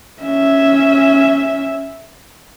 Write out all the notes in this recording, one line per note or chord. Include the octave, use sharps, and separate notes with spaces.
C#4 E5